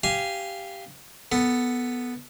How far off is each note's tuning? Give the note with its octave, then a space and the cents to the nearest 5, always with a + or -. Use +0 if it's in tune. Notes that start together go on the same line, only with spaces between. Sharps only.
G4 +0 F5 -15 G#5 +0
B3 +0 A4 +0